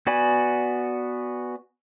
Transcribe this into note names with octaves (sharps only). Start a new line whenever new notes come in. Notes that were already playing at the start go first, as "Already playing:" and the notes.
B3 F#4 D5 G#5 B5